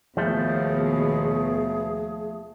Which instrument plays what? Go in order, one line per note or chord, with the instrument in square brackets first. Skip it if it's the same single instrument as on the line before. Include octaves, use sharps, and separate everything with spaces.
[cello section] D#2 B2 [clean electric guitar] F3 A3 [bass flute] G#4